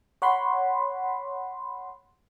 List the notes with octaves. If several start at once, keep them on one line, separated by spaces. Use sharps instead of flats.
C#5 F#5 B5 C6